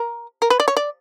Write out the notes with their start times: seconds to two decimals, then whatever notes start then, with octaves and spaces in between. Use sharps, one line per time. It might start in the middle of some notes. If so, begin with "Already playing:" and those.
Already playing: A#4
0.42 A#4
0.50 B4
0.60 D5
0.68 C#5
0.77 D5